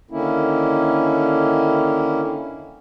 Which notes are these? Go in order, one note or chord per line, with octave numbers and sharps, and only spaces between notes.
D3 D#3 A#3 C#4 E4